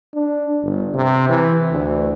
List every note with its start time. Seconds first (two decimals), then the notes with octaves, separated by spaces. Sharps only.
0.14 D4
0.62 G1
0.95 C3
1.29 E3
1.71 D2